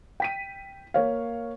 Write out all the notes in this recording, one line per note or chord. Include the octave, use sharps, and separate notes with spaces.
G5 B6 D#7
A#3 C#5 F5